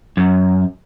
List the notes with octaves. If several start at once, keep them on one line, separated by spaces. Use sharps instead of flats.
F#2